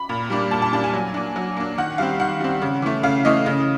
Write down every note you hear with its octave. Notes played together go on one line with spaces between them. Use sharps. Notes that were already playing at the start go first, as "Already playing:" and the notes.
Already playing: B5
A#2
G3 A#3 D4
A#2 A5
A5
G3 A#3 D4 A5
G#5
F#3
A#3 D4
F#3
A#3 D4
D#3 F#5
G3 C4 F5
D#3 F#5
G3 C4
C#3
E3 A3
C#3 F5
E3 A3 D#5
C#3